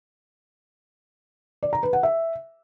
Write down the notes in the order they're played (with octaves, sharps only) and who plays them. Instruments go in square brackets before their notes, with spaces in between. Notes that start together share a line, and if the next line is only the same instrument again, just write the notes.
[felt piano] D5
A#5
B4
F#5
E5